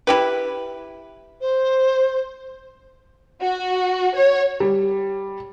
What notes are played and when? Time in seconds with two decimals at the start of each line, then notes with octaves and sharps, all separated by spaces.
0.07 E4 G4 B4
1.41 C5
3.42 F#4
4.16 C#5
4.60 G3